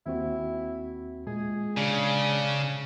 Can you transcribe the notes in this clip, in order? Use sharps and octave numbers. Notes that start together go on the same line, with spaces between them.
D#2 C4 E4 F#4
A#2 G#3 G#4
C#3 D4